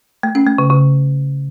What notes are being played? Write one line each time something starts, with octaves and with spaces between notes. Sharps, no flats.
A3
C#4
A3
C#3
C#3